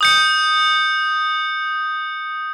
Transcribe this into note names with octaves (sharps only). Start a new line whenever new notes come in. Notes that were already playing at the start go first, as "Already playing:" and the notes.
D#6 G6 C#7